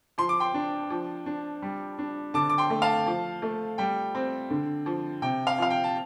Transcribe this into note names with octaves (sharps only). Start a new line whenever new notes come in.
F3 C6
D6
G5 C6
D4
F3
D4
G3
D4
D3 A5 D6
D6
G5 C6
A3
F5 A5
F3
A3
G3 G5
C4
D3
F3
C3 G5
F5
F3 F5
G5
A5